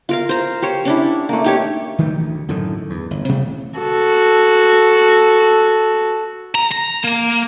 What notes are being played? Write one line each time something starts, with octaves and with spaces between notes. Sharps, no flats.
F4 A#4 F5
C5 A#5
G4 C5 C#5
C#4 D4 E4
A3 A#3
D#4 G4 C#5
D#3 E3 G3 A3
D2
F#2 A2 D3 D#3
E2
G1
A1 C3 G3 A3
F#4 A4
A#5
A#5
A#3